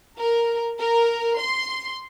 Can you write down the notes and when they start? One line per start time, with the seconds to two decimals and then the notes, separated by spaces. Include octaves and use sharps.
0.19 A#4
0.80 A#4
1.37 C6